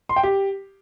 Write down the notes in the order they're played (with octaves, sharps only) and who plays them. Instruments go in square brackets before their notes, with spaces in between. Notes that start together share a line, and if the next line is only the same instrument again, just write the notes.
[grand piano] C6
G5
G4